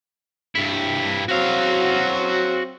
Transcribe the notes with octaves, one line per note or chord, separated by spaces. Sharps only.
G2 E4
F#3 C4 F#4 F5